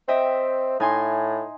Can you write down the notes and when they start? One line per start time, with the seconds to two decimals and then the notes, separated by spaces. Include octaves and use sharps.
0.08 C4 D#5 E5 G5
0.80 A2 D#4 G#5 C6